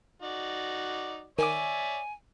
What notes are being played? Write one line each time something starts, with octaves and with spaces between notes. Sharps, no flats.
D#4 F#4 D5
D#3 C#5 D5 E5 G#5 D6